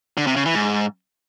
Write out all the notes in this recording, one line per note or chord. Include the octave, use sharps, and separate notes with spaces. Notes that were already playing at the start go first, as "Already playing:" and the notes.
D3
C3
C#3
E3
G#2